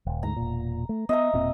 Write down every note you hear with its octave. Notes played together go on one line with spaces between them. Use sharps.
D#1
D2 G#2 A#5
E1 A#2
A3
B3 D#5 E5 A#5
E1 A#2 C4